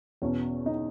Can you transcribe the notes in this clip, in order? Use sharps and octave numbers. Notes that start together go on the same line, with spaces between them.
E2 B2 C#4 C#5
D#4 D#5